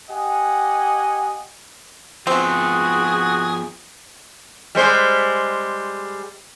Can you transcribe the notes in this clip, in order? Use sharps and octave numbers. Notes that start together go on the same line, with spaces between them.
G4 D#5 F#5 G#5
F3 B3 C4 F#4 G#4
G3 G#3 C5